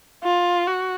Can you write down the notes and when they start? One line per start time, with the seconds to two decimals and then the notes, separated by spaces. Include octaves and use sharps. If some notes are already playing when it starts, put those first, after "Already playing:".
0.23 F4
0.67 F#4